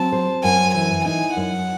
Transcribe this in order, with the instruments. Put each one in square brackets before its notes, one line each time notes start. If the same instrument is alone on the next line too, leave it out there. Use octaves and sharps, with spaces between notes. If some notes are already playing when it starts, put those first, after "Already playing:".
Already playing: [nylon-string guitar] F#3 C4 [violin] A5
[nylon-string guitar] C5
[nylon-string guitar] F#2 [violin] G#5
[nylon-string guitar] E3 [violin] G#5
[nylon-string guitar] D#4 [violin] G#5
[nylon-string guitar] F#2 [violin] F#5